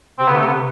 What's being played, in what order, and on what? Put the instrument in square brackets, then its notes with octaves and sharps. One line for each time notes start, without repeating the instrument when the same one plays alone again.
[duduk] C3 [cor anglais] C4
[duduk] D3 [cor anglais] B3
[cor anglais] A3
[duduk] C3 [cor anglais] B3